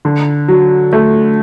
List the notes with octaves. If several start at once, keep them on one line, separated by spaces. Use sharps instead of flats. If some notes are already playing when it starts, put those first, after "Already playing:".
D3
F#3
A3